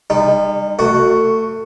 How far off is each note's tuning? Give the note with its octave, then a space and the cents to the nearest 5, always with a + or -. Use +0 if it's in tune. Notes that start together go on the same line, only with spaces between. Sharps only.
G3 +30 D#4 -30
A3 +25 F#4 +0